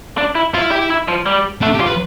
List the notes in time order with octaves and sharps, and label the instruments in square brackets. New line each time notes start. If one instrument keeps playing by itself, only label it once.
[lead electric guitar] D4
E4
[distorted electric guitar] E4 [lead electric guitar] F4
[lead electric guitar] G4
E4
F3
G3
[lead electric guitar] A3 [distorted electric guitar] D4
[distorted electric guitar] G4
[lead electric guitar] F4
[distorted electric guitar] B4